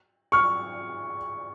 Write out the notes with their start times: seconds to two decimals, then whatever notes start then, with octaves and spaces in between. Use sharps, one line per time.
0.32 C#6 F6